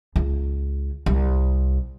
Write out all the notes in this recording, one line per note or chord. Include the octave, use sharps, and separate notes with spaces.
C#2
C2